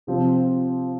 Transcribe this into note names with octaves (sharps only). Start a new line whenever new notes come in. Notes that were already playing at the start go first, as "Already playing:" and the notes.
C3 F3 C4